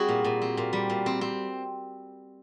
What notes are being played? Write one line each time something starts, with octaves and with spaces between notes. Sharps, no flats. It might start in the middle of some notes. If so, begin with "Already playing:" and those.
Already playing: G3 C4 F#4 G#4
A#2
A#2
C4
A#2
G3
A#2
C4
C4